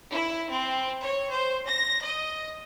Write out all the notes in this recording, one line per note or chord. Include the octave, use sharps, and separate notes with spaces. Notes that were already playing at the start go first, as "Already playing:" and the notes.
E4
C4
C#5
C5
A#6
D#5